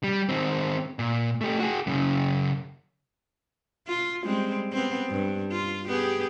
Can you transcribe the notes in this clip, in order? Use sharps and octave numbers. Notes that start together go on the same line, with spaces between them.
G3
D#3 C4
A#2
A3 G4
F#4 G#4
F#2 C#3
F4
G3 G#3 C4
B3 C4
G2
F4
B3 G4 G#4